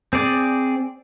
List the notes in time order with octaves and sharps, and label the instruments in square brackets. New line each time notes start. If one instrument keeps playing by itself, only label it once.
[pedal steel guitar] C4 G#4 D5